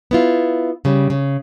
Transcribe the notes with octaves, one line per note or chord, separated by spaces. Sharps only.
B3 E4 F4
C#3 G3
C#3